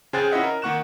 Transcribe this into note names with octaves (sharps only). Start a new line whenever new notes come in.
C#3 G#4 C5 G5 F#6 A6
C#4 E4 F4 D#5 E5 F#5
A#4
D#3 A#3 F#5 C#6 F#6 E7